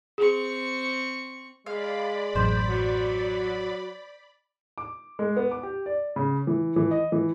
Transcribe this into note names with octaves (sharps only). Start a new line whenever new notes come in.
C4 G#4 C#6
G#3 D5 F5 B5
A1 F#2 C5
F#3
D6
G#3
B3
D6
G4
D5
C#3
E3
E3
D#5
E3